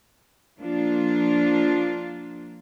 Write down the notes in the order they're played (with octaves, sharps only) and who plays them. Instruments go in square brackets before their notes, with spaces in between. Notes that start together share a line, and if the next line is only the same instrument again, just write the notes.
[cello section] F3 A#3 D4 F4